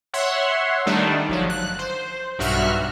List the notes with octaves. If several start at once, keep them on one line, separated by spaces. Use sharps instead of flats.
C#5 E5 F#5 C6
D#3 G3 A3 D4 D#4
G1 F3 F#3
F#6
C5
B1 G2 F#4 E5 F6 F#6